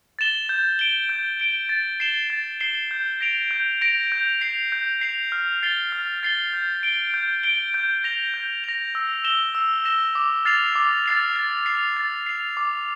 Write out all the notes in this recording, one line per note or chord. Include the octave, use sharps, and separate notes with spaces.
A6 E7 G7
G6
D7 G7
G6
D7 G7
A6
C7 E7 G7
A6
C7 E7 G7
G6
A#6 D7 F7
G6
A#6 D7 F7
G6
C7 F7
G6
C7 F7
F6
A6 C7 G7
F6
A6 C7 G7
G6
D7 G7
G6
D7 G7
G6
A#6 F7
G6
A#6 F7
E6
A#6 E7 G7
E6
A#6 E7 G7
D6
F6 A6 C7 F7
D6
F6 A6 C7 F7
A6
C7 F7
A6
C7 F7
D6